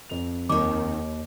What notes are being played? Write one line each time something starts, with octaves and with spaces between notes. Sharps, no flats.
F2 F7
D#2 D#3 C#5 D6